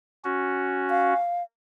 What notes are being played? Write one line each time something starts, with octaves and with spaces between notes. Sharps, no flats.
C#4 F#4
F5